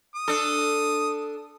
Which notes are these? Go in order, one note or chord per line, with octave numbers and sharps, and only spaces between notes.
D#6
D4 A4